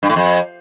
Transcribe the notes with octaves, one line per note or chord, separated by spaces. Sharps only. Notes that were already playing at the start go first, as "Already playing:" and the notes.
G2
A2
F2